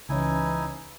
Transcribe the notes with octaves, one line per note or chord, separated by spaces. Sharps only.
C#2 E3 C#4 D#4 E4 G#5